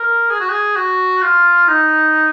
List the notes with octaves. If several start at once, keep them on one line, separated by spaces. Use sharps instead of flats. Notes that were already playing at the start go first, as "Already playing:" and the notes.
Already playing: A#4
G#4
F#4
G#4
F#4
F4
D#4